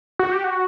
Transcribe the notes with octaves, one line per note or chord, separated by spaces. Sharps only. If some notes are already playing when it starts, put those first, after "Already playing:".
F#4
G4
F#4